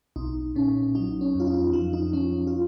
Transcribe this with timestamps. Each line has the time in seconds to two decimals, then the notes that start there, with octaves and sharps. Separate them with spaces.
0.16 B1 D#4
0.56 A#2 C#4
0.95 F#3 D#4
1.21 C#4
1.35 F2
1.40 F4
1.47 D#4
1.73 F2 F3 F4
1.93 D#4
2.13 F3 C#4
2.47 F4